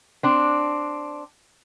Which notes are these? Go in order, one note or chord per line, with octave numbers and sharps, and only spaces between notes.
C4 D4